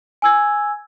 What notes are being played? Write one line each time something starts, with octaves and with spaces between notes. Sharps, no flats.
G#5 E6 G#6